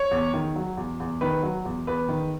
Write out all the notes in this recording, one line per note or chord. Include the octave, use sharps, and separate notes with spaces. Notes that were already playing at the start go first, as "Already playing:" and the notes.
Already playing: C#5
E2
D#3
F#3
E2
E2
D#3 B4
F#3
E2
E2 B4
D#3